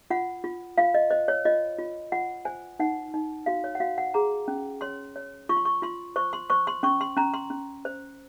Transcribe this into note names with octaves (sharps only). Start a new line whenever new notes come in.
F4 F#5
F4
F4 F5
D#5
C5 D#5
C#5
F4 D#5
F4
F4 F#5
C5 G#5
D#4 F#5
D#4
F#4 F5
C#5
F#5
F#4 F5
F#5
G#4 A#5
C#4
C#5 C6
C#5
F4 C#6
C6
C#6
F4 C6
C5 C#6
C6
C5 C#6
C6
C#4 C#6
C6
C#4 A#5
C6
C#4
C5